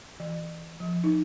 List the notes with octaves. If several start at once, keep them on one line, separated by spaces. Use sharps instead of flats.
E3
F3
D#4